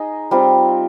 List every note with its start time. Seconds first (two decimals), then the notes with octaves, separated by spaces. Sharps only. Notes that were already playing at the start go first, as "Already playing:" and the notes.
Already playing: D#4 G#4 D#5
0.31 G3 C4 F4